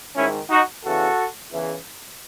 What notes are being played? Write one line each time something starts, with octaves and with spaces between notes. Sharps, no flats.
G#1 G#2 D#3 C#4 E4
D#4 F#4
E2 C#3 E3 F#4 A4
E2 C#3 E3